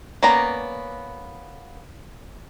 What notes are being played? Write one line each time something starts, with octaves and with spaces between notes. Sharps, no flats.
A#3 B3 C#4 D5 A#5